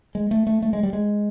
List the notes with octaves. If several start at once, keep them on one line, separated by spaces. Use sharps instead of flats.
G#3
A3
A3
A3
G#3
G3
G#3